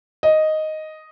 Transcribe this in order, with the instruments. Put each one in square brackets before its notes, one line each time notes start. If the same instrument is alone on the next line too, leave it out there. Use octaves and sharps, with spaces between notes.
[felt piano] D#5